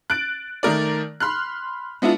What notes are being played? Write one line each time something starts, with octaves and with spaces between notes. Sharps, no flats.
F#6 A6 D7
D#3 A3 A#4 D5
B5 C6 F6 F#6
G#3 B3 D4 E4 F4